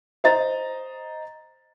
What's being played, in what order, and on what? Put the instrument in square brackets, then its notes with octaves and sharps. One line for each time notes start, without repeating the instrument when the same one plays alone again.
[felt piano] C5 D#5 A#5 A6